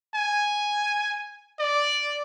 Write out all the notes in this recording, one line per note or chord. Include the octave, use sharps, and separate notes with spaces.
G#5
D5